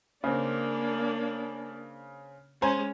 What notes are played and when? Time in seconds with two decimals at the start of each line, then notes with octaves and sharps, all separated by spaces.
0.24 C#3 A#3 C4 D4
2.62 G#3 C#4 C5 G#5 A#5